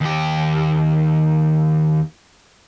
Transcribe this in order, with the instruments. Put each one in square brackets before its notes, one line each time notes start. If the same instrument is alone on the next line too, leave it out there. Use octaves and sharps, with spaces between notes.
[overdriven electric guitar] D#2 G4